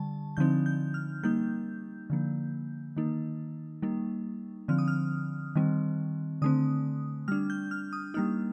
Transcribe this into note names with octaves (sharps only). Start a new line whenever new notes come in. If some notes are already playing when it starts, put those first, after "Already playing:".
Already playing: D3 G3 A5
D3 F3 C4 D#4 G6
G6
F6
G3 A#3 D#4 G6
D3 F3 A#3
D#3 A#3 D#4
G3 A#3 D#4
D3 F3 C4 F6
D#6
F6
D#3 G3 C4
D3 A3 C4 D#6
G3 D4 F6
G6
F6
D#6
G3 A#3 D#4 F6